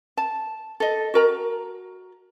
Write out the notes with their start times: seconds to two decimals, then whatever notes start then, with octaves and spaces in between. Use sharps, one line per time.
0.17 A5
0.80 A4 D#5
1.14 F#4 A#4 A#5